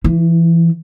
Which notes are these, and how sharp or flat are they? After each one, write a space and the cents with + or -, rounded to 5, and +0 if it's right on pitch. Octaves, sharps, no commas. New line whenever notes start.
E3 +20 E4 -25